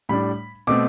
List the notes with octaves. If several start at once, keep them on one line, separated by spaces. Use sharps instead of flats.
A2 G3 D4 B5
B2 A3 C4 D6